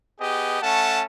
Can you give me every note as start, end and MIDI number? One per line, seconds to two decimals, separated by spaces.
0.21 0.59 59
0.21 0.59 67
0.21 0.59 68
0.21 0.59 75
0.62 1.01 57
0.62 1.01 61
0.62 1.01 78
0.62 1.01 81